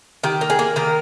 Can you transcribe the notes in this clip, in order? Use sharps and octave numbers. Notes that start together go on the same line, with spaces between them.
D#3 G4
A#3
G#4
A#3
D#3 A#4